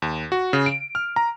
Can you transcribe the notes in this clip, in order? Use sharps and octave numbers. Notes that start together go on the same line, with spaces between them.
D#2
F#4
C#3
D7
F6
A#5